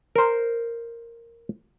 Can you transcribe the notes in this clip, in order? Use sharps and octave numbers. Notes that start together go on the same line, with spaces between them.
A#4 C5